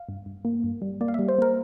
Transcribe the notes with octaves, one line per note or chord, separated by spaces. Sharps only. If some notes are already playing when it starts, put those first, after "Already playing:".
Already playing: F5
G2
G2
A#3
G2
G3
A#3 D5
F5
G3 E5
C5
A#3 A#4